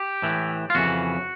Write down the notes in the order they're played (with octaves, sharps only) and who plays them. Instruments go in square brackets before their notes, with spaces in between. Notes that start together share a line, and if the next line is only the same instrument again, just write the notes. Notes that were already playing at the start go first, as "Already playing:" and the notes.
Already playing: [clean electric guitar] G4
A2 E3
F4
F2 C#3 E3 F#4